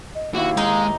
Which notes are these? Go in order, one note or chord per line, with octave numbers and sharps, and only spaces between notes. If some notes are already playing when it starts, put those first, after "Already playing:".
D#5
D#2 E4 F#4 F5
G#3 D#4